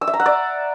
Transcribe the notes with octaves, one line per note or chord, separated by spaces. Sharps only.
E6
E5
A#5
F#5
D5